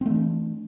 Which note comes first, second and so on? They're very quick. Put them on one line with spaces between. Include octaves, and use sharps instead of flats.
C4 A3 E3 D4